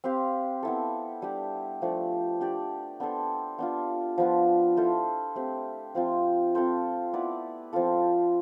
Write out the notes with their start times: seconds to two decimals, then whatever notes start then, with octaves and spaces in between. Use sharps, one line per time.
0.04 C4 G4 B4 F5
0.63 B3 E4 A4
1.22 G3 D4 G4
1.82 F3 A3 D4
2.41 D4 G4 D5
3.00 B3 D4 A4 C5
3.59 B3 D4 F4
4.18 F3 B3 F4 B4
4.77 E4 A4 C5 F5
5.35 A3 C4 G4
5.95 F3 C4 F4
6.55 C4 F4 A4 C5
7.13 B3 E4 B4 D5
7.73 F3 C4 F4 A4